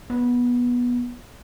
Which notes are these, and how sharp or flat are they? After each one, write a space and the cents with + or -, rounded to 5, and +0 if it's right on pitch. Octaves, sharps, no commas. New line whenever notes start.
B3 -15